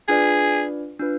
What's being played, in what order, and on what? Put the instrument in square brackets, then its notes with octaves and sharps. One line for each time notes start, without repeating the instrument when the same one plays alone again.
[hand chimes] D4 F4 B4 D5 [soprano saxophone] G#4
[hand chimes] D4 F4 B4